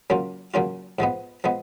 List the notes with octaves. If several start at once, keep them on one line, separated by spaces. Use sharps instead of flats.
C#3 F#3 A#3 C#4 F4
C#3 F#3 A#3 C#4 F4
G#2 F3 G#3 B3
F3 G#3 B3